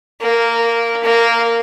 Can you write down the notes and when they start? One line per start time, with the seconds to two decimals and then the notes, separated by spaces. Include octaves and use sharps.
0.21 A#3
1.03 A#3